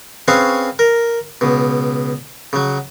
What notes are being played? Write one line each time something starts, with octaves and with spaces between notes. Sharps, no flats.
C4 C#4 G#4 B4 C#5 F5
A#4
C#2 B2
C#3 F#3